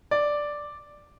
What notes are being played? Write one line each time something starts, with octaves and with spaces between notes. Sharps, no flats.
D5